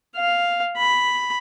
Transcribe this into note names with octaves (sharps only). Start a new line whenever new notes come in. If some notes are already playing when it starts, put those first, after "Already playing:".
F5
B5